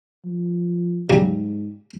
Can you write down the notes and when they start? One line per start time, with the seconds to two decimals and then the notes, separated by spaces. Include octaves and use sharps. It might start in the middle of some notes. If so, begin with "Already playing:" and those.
0.25 F3
1.10 G#2 C#3 F#3 G3